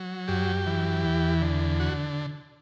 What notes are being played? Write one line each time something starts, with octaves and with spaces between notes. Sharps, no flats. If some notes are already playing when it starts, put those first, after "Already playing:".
Already playing: F#3
F#2 G4
E3
E2
D3
F#4